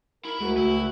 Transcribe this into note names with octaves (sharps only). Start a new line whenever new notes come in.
E4 A#4 B5
D2 G#3 F#4 A#4
C#2 E4